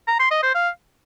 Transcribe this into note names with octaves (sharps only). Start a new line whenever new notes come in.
A#5
C6
D#5
C5
F5